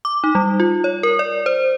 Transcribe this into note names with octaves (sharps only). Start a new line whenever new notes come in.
D6
D#4
G3
F4
C#5
A#4
D5
C5